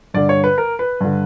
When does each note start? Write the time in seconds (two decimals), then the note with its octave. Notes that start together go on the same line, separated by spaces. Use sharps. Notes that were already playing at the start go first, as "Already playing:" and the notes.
0.14 G2 D3 D5
0.29 C#5
0.44 B4
0.58 A#4
0.79 B4
1.00 G2 D3